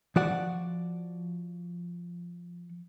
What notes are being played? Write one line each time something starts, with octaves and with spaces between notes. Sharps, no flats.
F3 F#4 D5 F#5